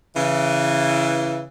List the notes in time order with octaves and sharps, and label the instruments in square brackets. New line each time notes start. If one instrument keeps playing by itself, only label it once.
[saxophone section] C#3 E3